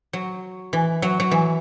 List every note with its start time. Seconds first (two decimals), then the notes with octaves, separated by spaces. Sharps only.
0.13 F#3
0.73 E3
1.02 F#3
1.20 F#3
1.31 E3